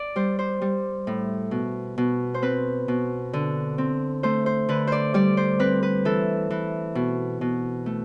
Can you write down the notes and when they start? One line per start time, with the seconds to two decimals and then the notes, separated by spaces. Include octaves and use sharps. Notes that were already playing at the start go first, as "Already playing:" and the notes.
Already playing: D5
0.16 G3 C5
0.39 C5
0.62 G3
1.07 A2
1.51 B2
1.98 B2
2.34 C5
2.42 C4 B4
2.88 B2
3.33 D3
3.78 C4
4.23 A3 C5
4.46 C5
4.69 D3 B4
4.87 C5 D5
5.14 G3 D5
5.37 C5
5.59 C4 B4
5.83 B4
6.05 E3 A4
6.50 E3
6.95 B2
7.41 B2
7.86 A3